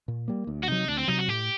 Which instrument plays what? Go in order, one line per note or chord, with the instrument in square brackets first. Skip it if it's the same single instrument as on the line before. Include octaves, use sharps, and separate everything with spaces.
[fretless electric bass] A#2
G3 A#3
D2
[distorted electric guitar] F#4
[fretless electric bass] C3 F#3 [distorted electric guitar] D#4
[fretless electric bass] D2 [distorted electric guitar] D4
[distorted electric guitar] C4
[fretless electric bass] C3 F#3 [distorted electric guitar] D#4
[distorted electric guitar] F#4
[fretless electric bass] A2 [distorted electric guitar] G4